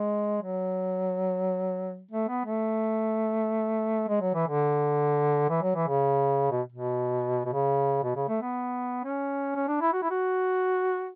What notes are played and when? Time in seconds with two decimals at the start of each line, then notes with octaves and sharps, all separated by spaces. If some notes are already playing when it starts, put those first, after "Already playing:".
Already playing: G#3
0.42 F#3
2.11 A3
2.29 B3
2.45 A3
4.08 G#3
4.21 F#3
4.34 E3
4.48 D3
5.50 E3
5.62 F#3
5.75 E3
5.87 C#3
6.51 B2
6.72 B2
7.45 B2
7.53 C#3
8.04 B2
8.16 C#3
8.29 A3
8.41 B3
9.04 C#4
9.55 C#4
9.68 D4
9.81 E4
9.93 F#4
10.02 E4
10.10 F#4